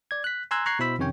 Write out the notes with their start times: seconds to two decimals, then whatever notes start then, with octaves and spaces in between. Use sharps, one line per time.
0.11 D5 G#6
0.24 F#6 B6
0.51 G#5 A#5 C6 E6 F#6 G#6
0.66 A#5 C#6 F#6 G#6 C7
0.79 B2 E4 C5 B5 E6 B6
0.99 F2 C3 D#3 C#4 C#5 G5